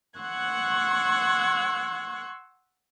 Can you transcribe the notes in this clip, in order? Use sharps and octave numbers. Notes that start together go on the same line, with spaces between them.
F#5 C6 C#6 E6 F#6 G#6